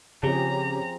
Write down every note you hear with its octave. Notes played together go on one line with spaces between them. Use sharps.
C#3 F3 C4 C#4 G4 G#4 A#5